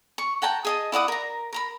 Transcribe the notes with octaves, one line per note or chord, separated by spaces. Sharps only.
C#6
F#5 G5 A5 A#5
G#4 D#5 A5
E4 D5 F#5 D#6
A#4 A#5
A#4 A#5 B5